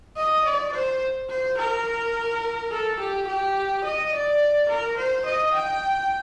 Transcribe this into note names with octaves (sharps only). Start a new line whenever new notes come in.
D#5
D5
C5
C5
A#4
A4
G4
G4
D#5
D5
A#4
C5
D#5
G5